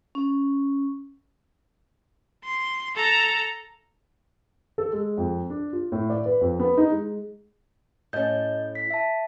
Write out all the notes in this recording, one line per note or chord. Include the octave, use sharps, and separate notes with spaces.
C#4
C6
A4 A#5
A4
G#3
F2
D4
F4
A2
D5
B4
F2
B3
D#4
G#3
A2 C#4 D#5 G6
B6
E5 A5